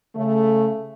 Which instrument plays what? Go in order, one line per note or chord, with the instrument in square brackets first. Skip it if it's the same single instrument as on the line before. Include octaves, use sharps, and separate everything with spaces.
[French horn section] C#3 A3